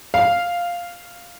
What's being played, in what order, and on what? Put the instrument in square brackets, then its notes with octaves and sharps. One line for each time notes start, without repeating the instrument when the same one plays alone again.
[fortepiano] F5